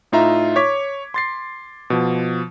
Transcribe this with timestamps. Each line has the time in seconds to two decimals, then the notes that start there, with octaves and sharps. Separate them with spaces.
0.12 A2 D#4 F4 E5 A#5
0.56 C#5 C#6 D6 G#6 B6
1.14 C6 A6 C7
1.90 B2 F3